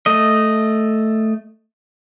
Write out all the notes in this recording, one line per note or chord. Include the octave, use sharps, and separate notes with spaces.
A3 D#5